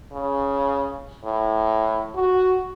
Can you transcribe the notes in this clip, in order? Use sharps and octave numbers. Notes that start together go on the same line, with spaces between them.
C#3
A2
F#4